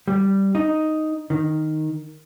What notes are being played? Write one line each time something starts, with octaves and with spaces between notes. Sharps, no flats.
G3
D#4
D#3